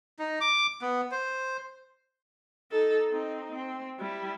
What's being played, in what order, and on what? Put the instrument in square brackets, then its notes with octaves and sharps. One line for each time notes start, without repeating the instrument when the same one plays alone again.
[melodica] D#4
D6
B3
C5
[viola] D#4 A4
C4 D#4
C4
G3 E4